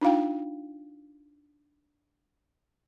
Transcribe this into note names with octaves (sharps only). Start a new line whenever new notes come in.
D4 D#4 F4 F5 G5